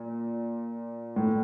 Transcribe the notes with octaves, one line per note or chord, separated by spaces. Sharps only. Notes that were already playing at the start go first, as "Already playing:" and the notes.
Already playing: A#2
A2